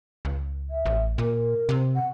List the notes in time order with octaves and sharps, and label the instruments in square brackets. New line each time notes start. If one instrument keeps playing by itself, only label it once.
[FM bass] C#2
[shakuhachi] E5
[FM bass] A1
[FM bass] A#2 [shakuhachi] A#4
[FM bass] C3
[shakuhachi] F#5